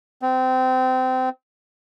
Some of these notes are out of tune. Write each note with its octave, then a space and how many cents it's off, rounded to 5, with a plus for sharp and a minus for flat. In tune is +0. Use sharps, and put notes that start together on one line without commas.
C4 -25